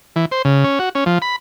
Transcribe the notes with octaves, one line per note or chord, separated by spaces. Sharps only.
E3
C5
C#3
C#4
F#4
C#4
F3
B5